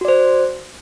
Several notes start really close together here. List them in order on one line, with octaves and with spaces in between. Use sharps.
F#4 D5 C5